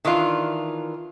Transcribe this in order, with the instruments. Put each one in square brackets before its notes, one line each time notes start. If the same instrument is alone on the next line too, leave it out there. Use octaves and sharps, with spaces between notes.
[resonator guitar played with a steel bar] D#3 E3 D4 F4